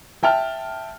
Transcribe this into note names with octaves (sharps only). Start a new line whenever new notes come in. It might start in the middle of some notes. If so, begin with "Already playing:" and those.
E5 G5 A5 F6